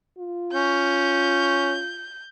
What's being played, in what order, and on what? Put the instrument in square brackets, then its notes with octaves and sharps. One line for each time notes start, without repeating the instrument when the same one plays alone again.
[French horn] F4
[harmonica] C#4 [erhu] G6